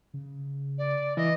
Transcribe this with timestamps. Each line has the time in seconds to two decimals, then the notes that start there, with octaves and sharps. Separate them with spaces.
0.14 C#3
0.78 D5
1.17 E3 D#5